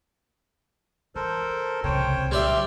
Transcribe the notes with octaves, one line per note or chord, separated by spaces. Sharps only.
E3 A4 A#4 C5
C2 C#3 C5 C#5 G5
D3 F#3 G3 D5 E5 C6 F6